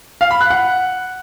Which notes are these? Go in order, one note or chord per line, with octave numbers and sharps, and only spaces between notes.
F5
B5
F#6
F#5